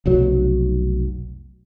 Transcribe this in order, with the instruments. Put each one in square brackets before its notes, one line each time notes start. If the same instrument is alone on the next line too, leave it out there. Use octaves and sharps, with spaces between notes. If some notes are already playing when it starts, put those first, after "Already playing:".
[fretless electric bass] F1 B1 F#3